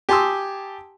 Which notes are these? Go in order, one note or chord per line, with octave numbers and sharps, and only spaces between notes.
G4 G#5 A5 C6 D#6 E6